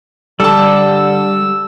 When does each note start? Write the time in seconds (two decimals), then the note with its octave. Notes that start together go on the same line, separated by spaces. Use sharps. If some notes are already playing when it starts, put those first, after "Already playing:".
0.40 D3 G3 A4 A5 E6